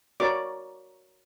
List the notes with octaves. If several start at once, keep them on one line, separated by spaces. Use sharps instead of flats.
F#4 A#4 C#5 D5 D6